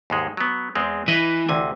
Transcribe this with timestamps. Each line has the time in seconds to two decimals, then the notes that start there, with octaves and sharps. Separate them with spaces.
0.10 D#2 G#2 G#3
0.37 F#3 B3
0.75 E2 G#3 C4
1.08 E3 B4 D#5 G#5
1.49 D2 C3 G#5